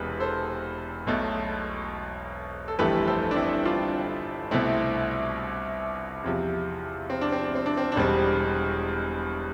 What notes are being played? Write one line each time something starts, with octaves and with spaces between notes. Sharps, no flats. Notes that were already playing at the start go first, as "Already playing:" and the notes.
Already playing: E1 E2 C3 B4
A4 C5
B1 B2 A3
A4
G1 F2 E3 A3 G4 B4
A4 C5
D4
C4 E4
D4 F4
C2 B2 A3 C4 E4
E2 C3 F3
C4
D4
C4
D4
C4
D4
C4
D4
E1 E2 B2 G3 C4